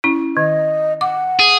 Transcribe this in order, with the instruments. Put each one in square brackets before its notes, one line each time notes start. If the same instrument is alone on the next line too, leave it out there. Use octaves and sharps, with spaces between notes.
[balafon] C#4 E4
[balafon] D#3 [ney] D#5
[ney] F#5 [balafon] D6
[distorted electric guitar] G#4